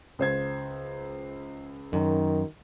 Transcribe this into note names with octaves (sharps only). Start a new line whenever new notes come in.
C#2 C5 G#6
F#2 D#3